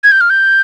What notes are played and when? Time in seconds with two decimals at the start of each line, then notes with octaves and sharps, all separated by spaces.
0.04 G#6
0.12 G6
0.21 F6
0.30 G6